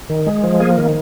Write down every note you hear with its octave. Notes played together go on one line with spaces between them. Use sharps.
D#3
G#3
F3
A#3 G#4
D#3